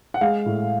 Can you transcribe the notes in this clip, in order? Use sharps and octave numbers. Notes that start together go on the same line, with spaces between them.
F#5
G#3 F5
A2